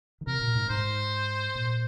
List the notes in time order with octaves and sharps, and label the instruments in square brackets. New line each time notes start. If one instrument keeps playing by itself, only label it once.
[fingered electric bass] D#3
[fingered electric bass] C3 [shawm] A#4
[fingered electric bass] A#2
G#2
[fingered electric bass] G#2 [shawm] C5
[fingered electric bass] A#2